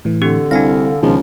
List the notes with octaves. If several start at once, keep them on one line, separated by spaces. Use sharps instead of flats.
A2 E3
D3 C4 D4 G4
C2 D4 F5 G#5 A#6
C#2 B2 D#3 F3 G#3